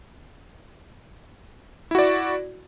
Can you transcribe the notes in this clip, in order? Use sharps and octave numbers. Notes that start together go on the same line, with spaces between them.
E4 F#4 D5